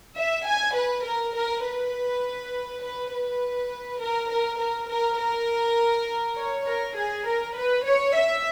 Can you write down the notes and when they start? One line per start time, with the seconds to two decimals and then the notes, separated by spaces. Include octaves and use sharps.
0.17 E5
0.46 G#5
0.76 B4
1.05 A#4
1.36 A#4
1.64 B4
2.83 B4
3.12 B4
4.01 A#4
4.31 A#4
4.60 A#4
4.90 A#4
5.19 A#4
6.37 C#5
6.67 A#4
6.96 G#4
7.26 A#4
7.55 B4
7.85 C#5
8.15 E5